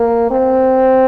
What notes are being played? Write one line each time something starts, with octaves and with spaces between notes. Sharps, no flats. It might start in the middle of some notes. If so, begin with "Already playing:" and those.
Already playing: A#3
C4